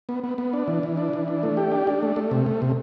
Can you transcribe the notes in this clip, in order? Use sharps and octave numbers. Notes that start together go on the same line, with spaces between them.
B3
B3
B3
D4
E3
E3
D4
E3
D4
A3
G4
D4
D4
A3
A3
C3
A3
C3